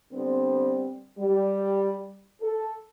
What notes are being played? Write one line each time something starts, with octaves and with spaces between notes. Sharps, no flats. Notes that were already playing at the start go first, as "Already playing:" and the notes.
D3 G3 B3 C4
G3
A4